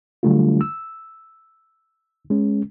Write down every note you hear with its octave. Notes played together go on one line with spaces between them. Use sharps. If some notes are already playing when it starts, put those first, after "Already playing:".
D3 F#3 G3 A3 D4 F4
E6
G#3 C#4